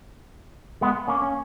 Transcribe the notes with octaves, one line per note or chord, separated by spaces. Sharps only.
G#3 B3
A#3 C#4
C#4